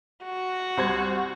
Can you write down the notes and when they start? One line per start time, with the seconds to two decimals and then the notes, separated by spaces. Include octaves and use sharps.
0.23 F#4
0.77 C2 C5 G#6